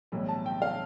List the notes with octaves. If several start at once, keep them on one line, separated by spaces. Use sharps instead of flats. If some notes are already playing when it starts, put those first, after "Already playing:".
B1 A2 E3 G3 B3
A5
G5
F5